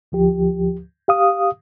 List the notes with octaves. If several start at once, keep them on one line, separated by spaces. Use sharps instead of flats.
D2 F3 G4
G4 F5 D#6